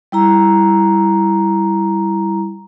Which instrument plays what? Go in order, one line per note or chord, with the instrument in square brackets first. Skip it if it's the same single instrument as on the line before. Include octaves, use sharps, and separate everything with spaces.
[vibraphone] G3 E4 A#5